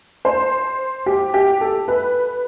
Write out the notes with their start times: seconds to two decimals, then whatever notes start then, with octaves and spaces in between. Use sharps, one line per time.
0.25 C5
1.06 G4
1.34 G4
1.61 A4
1.88 B4